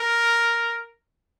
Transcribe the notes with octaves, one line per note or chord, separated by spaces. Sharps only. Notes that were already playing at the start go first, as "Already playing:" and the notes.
Already playing: A#4